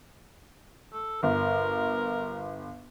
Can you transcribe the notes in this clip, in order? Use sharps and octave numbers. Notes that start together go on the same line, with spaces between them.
A4
G1 A#4